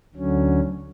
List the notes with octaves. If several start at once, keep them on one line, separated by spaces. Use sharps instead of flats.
D2 D3 F#3 C#4